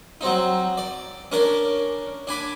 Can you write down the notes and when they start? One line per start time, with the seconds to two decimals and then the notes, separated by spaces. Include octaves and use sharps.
0.21 F#3 C4 D#4
0.78 D5
1.32 C#4 D4 A#4 D5
2.27 D4 G#5 B5 D6